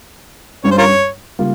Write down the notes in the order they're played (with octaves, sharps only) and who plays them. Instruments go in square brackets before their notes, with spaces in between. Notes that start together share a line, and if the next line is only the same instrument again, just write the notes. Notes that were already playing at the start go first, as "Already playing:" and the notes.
[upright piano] G2 G3 C#4 [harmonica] C#5
[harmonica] C5
F4 A#4 C#5
[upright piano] C#3 G3 A#3 F4